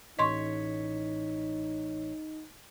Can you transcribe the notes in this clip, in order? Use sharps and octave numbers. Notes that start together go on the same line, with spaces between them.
A1 D#4 C#5 D#5 C6 C#6 B6